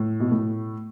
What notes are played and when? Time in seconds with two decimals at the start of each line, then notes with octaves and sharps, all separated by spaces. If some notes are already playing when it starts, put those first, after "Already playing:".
Already playing: A2
0.20 B2
0.31 A2